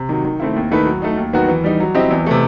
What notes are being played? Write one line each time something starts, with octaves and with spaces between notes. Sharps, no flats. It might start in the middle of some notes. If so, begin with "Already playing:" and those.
Already playing: C3
D#3 F#3
D#3
A3 C4 E4
D#2
D#3 A3 E4 B4
F#3
A3 D#4
D#2
D#3 F#3 B3 F#4
E3
G3 D#4
F#3
C4 E4 G4 D#5
E2
C3 E3 A3